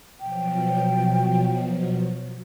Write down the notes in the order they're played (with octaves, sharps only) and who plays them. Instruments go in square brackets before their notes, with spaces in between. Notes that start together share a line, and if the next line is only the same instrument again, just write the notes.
[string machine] B2 F3 F#3 [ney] G5